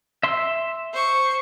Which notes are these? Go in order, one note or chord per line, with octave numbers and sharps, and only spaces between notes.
E5 C6
C5 C#6